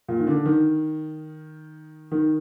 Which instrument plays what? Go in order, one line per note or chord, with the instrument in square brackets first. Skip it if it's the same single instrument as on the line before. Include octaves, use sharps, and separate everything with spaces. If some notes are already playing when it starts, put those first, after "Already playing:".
[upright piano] A#2
D#3
D3
D#3
D#3